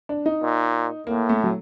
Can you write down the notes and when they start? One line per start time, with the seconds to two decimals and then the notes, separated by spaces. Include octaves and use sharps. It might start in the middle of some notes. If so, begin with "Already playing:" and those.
0.09 D4
0.26 D#4
0.42 A#2
1.07 A2 A#3
1.29 A3
1.44 F#3